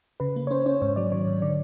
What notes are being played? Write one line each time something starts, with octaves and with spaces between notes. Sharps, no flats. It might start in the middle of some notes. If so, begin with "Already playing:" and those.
C#3 B4
A#3
C#5
C#4 C5
C#4 C#5
G#2 C#5
F#3 D5
D#3 C#5
G#2
D3 D5